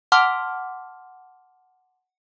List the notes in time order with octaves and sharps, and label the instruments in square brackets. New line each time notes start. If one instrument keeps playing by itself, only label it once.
[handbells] F#5 A5 C6 D6 E6 F6